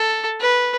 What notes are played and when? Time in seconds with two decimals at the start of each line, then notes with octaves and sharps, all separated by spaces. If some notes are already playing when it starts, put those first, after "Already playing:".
Already playing: A4
0.40 B4